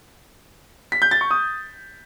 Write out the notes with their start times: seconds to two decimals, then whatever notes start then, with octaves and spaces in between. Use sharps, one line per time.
0.92 B6
1.02 G6
1.11 A6
1.21 C#6
1.31 D#6